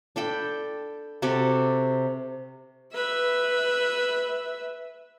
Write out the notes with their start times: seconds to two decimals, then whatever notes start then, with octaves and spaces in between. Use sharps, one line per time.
0.16 D4 A4 G5 B5
1.22 C3 F#4 A4 D6
2.94 B4 E5